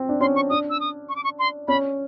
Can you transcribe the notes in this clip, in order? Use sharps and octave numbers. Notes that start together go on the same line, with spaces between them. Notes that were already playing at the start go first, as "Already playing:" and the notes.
Already playing: C4
D4
C#4 C6
C#6
D4 D#6
E6
D#6
C#6
D6
C#6
C6
C#4 B5